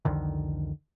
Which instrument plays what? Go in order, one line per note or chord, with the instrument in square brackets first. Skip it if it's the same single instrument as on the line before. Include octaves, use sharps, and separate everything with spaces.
[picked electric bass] C2 F2 D3 D#3